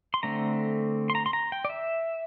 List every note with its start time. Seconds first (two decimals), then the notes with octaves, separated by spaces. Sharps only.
0.14 C6
0.23 D3 A3 C4 A#5
1.10 C6
1.15 A#5
1.26 C6
1.33 A#5
1.52 G5
1.65 D5
1.70 E5